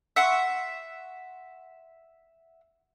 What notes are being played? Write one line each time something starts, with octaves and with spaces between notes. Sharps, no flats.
E5 F#5 C6 C#6